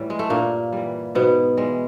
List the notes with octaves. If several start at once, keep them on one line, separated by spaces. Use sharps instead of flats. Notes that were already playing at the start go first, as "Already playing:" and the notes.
Already playing: A2 E3 G3
G#3
A3
G2 A#2 A#3
E3 G3
G#2 B2 B3
E3 G3 G#3